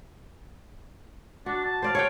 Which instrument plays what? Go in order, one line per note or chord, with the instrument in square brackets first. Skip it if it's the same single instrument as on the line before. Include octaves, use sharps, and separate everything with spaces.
[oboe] D4 [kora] F#4
[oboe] A5
[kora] C5 D5 F5
C#5 F5 G5